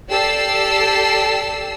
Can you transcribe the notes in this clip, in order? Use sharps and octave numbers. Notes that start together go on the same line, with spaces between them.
G4 A4 D5 E6 C7